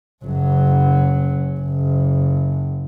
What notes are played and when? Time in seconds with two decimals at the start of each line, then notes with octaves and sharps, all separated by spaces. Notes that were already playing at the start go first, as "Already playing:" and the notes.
0.25 F#1 F#3
1.60 F#1